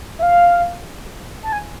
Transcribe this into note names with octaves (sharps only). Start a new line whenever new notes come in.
E5
F5
A5
G#5